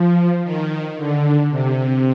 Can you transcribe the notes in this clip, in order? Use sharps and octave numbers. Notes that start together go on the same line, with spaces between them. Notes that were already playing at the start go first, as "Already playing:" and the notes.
Already playing: F3
D#3
D3
C3